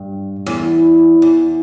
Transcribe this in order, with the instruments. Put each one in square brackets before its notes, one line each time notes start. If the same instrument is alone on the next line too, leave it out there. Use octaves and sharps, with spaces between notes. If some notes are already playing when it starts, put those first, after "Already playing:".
Already playing: [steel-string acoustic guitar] G2
E2
E2